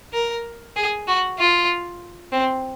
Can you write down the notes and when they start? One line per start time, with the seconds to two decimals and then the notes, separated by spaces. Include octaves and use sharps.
0.13 A#4
0.76 G#4
1.08 F#4
1.38 F4
2.32 C4